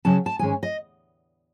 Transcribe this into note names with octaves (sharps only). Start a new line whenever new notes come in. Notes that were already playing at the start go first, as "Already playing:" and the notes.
C#3 F#3 C#4 A5
A5
G#2 D#3 G#3 C#4 G#5
D#5